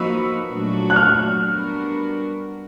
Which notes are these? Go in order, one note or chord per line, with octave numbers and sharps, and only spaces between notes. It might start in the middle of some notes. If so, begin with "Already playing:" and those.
Already playing: F3 A#3 D#4 F#4 B4 E6
A#2 F#3 A3 D4 F#4
F#6
F6
G3 B3 D4 F#4 A#4